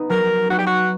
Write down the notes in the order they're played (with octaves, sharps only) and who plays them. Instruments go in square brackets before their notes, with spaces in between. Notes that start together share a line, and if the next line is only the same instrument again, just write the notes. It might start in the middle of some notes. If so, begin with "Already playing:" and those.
Already playing: [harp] B3 D#4
[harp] F#3 [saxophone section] A#4
[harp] B3 D#4 [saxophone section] F#4
[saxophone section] G4
F#4